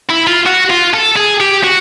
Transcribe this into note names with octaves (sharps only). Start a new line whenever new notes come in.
E4
F4
F#4
F4
A4
G#4
G4
F#4